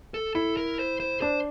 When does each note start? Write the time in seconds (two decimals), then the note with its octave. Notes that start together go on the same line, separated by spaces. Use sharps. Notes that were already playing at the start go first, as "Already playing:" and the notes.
0.14 A4
0.35 E4 A4
0.57 A#4
0.79 C5
1.00 C5
1.21 D4 C5